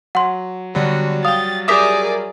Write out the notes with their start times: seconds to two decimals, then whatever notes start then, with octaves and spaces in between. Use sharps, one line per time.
0.15 F#3 F#5 C6
0.75 D3 F#3 G3 B3 F#4
1.25 F5 G5 D#6 A6
1.68 G4 G#4 A#4 D5 E5 D6 D#6 B6